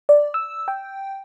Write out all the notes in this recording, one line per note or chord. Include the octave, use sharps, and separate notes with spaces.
D5
E6
G5